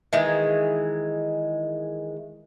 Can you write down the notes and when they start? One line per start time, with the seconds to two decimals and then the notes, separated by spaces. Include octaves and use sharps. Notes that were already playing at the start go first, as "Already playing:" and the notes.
0.13 D#3 E3 G#3